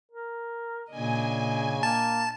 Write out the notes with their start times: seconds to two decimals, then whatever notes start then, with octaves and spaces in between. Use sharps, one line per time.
0.12 A#4
0.91 A#2 C#3 D4 D#5 G#5
1.83 A#3 A5